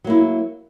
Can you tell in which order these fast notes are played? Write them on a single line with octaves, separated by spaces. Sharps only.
F#3 A#3 E4